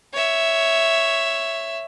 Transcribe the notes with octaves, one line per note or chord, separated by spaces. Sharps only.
C#5 E5